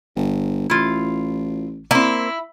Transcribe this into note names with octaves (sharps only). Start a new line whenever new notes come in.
G1
A1 E4 F4
A#3 C4 E4